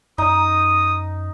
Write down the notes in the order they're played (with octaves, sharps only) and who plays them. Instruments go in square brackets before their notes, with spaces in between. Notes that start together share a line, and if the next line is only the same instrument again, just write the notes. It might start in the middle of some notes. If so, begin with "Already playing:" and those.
[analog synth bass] F#2 [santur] D#4 [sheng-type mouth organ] D#6